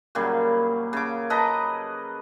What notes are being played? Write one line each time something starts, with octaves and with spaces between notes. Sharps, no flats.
A#2 C#3 F#3 G3
C#3 D6
A4 B4 D#5 A#5